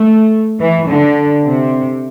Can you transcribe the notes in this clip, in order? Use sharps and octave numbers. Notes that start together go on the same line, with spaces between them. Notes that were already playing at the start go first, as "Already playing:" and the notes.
Already playing: A3
E3
D3
C3